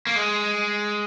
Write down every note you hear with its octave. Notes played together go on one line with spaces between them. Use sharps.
A#3
G#3